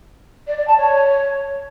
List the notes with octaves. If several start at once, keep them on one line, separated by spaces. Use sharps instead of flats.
D5
D5
A5
C#5